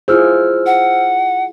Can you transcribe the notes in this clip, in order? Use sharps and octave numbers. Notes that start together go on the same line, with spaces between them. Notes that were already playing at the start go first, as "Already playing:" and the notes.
E4 F4 G#4 C5 E6 F6
F#5